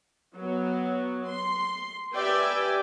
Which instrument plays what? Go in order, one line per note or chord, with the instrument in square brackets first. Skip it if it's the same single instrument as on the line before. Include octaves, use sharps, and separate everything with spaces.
[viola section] F#3 B3
C6
G4 B4 D5 E5 G5 G#5